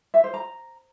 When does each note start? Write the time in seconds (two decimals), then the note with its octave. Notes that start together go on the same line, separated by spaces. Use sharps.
0.14 E5
0.24 C5
0.34 A#5